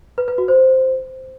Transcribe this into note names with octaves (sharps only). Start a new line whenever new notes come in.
B4
B4
F#4
C5